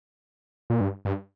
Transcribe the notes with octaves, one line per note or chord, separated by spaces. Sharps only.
A#2
G2
G2